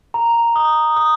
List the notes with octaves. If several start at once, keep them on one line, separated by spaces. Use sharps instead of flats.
A#5
D#6
D#6